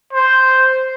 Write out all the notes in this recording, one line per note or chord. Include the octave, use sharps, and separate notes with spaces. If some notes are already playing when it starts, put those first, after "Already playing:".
C5